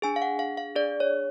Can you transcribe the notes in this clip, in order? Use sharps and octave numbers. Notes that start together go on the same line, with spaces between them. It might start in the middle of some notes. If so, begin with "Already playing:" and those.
D4 G#4 G#5
F5
F#5
F5
F5
D4 G#4 D5
C#5